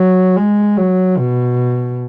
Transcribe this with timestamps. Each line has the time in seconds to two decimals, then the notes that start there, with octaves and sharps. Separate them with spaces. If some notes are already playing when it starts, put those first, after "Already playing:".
Already playing: F#3
0.36 G#3
0.77 F#3
1.18 B2